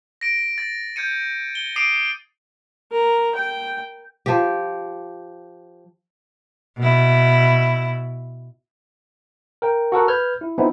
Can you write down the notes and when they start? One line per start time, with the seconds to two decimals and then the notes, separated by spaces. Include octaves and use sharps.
0.21 A#6 D7
0.58 A6
0.96 G6 G#6 C#7 D#7
1.55 G7
1.76 D6 D#6 C7 D7 D#7
2.91 A#4
3.35 G5
4.26 F3 G4
6.77 B2 E4
9.62 A#4 G5
9.92 F#4 A4 A#4 F#5
10.08 B4 F6 G6 G#6
10.41 E4
10.58 F3 B3 C4 D#4 E4